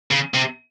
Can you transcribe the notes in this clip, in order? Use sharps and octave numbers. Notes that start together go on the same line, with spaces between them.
C#3
C3